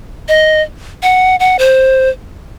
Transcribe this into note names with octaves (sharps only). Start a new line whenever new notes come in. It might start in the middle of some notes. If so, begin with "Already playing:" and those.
D#5
F#5
F#5
C5